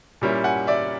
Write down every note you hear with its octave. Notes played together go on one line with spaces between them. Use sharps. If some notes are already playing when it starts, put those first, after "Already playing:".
A#2 G3 A#3 C#4 E4
F#5 G#5
D5 E5